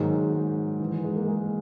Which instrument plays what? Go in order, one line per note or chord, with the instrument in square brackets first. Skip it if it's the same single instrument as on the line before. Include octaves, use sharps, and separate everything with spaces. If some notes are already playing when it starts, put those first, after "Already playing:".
Already playing: [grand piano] G#2 D#3 F#3 [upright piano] A#3
[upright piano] G#3
E3
E3
G#3
A#3
G#3